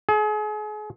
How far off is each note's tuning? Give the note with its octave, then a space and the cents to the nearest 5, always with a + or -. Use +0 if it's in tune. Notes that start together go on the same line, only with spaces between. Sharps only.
G#4 +35